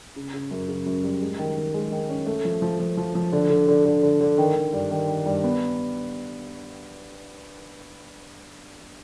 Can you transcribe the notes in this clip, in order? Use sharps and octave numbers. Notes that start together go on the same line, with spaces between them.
C#3
C#3
F#2
C#3
F#2
G3
G#3
D#3
D#3
G#3
D#3
C#4
A3
F3
F3
F3
F3
F3
D3
D3
D3
D3
D3
D3
D#3
D#3
G2
D#3
D#3
G2
B3